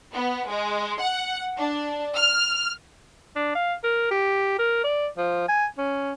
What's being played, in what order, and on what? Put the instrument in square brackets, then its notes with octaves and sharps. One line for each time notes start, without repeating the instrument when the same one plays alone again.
[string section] B3
G#3
F#5
D4
F6
[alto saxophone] D4
F5
A#4
G4
A#4
D5
F3
G#5
C#4